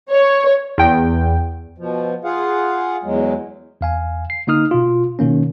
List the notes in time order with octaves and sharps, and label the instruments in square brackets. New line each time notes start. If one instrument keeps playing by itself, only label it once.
[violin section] C#5
[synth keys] E2 G5
[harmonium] B2 F3
F4 G#4 F5 F#5
E2 F#3 G#3
[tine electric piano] E2 F5 G#5
C7
D3 A#3 D#4 D#6 F6
B2 F4
B2 D#3 A#3 C#4